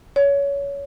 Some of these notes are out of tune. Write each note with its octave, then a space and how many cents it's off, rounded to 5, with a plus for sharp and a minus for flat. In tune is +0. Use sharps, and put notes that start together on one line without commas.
C#5 +20